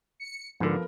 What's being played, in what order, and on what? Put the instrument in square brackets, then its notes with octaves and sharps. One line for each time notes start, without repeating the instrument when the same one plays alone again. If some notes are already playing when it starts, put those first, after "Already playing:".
[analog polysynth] C#7
[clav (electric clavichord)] G#2 D3 [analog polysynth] F3 [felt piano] B3 A4 A#4